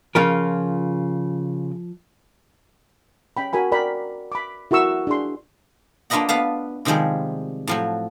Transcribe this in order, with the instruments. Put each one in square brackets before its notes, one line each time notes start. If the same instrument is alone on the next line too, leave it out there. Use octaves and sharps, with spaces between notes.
[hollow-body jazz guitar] C#3 F4 A#4 [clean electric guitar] F3
[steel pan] C#4 G5 B5
F#4 A#4 G#5 B5
A#4 D5 G5 B5
B5 D6
E4 F#4 A#4 C#6 E6
D4 G#4 C6
[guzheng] A#3 D4 F4 B4 D#5 F#5
B3 B4 F5 A5
C3 D#3 F3 G3 G#3
A2 F3 F#3